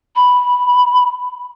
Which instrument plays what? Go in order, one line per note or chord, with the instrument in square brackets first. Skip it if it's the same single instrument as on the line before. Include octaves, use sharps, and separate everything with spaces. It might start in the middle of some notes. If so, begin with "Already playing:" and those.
[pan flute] B5